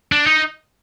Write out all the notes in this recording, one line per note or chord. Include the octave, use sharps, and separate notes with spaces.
D4
D#4